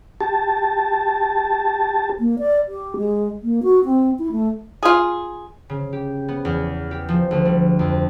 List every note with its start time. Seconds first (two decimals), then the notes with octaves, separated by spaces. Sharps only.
0.21 G4 A5
2.19 A#3
2.39 D5
2.68 G4
2.97 G#3
3.43 A#3
3.63 F#4
3.85 C4
4.19 E4
4.32 A3
4.83 F4 G#4
5.70 C#3
5.93 G4
6.28 B3
6.45 E2
6.91 G4
7.09 F3
7.31 D2
7.45 G3
7.79 F2